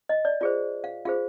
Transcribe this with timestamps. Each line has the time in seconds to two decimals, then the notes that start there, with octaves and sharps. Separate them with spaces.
0.09 D#5
0.25 D5
0.41 F4 G#4 C5 D5
0.84 F5
1.05 F4 G#4 C5 F5